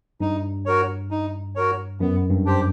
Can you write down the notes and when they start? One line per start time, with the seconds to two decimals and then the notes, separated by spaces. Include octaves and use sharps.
0.20 G2 D#4
0.66 F#4 A#4 C#5
1.11 D#4
1.56 F#4 A#4 C#5
2.00 F#2 B3
2.30 G2
2.45 D4 G4 C5